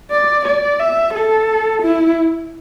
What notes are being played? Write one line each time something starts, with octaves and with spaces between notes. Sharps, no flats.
D5
D5
E5
A4
E4